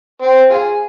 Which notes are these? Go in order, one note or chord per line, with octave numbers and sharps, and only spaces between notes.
C4
F4 G#4